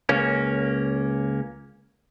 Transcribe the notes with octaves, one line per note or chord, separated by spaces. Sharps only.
C#2 A#3 C#4